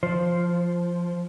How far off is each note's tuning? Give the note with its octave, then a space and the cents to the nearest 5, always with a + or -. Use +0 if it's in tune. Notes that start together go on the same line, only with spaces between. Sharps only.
F3 -5 C5 +0